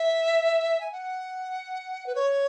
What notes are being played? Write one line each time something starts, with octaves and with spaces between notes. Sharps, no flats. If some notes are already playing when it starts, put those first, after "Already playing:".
Already playing: E5
G#5
F#5
B4
C#5